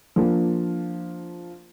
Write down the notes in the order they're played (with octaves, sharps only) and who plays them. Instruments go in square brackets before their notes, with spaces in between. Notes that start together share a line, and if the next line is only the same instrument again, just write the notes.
[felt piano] F3 A#3 D4